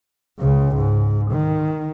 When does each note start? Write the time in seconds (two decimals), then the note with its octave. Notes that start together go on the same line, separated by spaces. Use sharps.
0.39 C#2 C#3
0.76 G#2
1.31 D#3